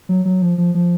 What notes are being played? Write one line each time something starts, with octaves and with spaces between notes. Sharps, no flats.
F#3
F#3
F3
F3
F3